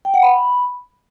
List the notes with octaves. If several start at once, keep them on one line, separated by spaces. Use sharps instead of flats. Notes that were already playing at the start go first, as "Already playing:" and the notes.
G5
F#5
B5